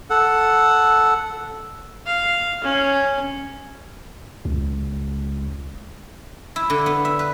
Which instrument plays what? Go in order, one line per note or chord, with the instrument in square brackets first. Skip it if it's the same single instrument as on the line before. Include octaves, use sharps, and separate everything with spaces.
[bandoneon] A4 F#5
[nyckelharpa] F5
C#4
[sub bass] C#2
[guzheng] E4
D3
B3
E5
B4